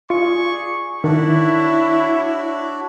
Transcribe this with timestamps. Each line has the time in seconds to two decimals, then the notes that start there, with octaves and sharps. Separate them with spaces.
0.10 F4 G#4 D5 C#6
1.04 D#3 D4 E4 F#4 C#5 D5 E5